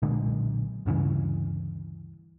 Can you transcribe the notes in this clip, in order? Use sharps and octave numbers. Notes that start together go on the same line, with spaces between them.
B1 A#2 D3 G#3
D2 G2 C#3 E3